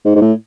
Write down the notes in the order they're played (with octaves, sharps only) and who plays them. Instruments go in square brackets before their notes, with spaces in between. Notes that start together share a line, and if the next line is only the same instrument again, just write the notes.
[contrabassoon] G#2
G#2
A2